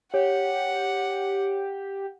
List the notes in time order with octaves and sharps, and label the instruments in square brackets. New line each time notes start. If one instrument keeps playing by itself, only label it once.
[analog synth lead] G4 [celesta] C#5 [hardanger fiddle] F#5